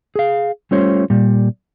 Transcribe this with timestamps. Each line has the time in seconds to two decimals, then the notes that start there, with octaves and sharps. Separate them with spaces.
0.16 G#4 F5
0.71 G3 A3 C#4 F4 C5 C#5
1.10 A#2 G3